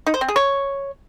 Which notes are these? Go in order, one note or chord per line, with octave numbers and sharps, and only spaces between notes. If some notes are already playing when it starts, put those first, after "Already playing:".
D#4
C5
C4
G#4
C#5